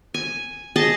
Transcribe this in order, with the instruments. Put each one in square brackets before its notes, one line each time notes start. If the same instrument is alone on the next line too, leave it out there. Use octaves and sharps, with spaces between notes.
[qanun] G#5
G#4 D#5 A5